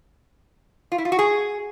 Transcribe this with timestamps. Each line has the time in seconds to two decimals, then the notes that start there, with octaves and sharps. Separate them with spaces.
0.92 F4
0.98 E4
1.05 F4
1.12 F#4
1.19 G#4